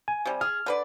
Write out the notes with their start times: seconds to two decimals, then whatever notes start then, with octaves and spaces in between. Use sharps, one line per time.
0.08 G#5
0.26 C3 G3
0.41 G#4 F6
0.66 D3 B4 D5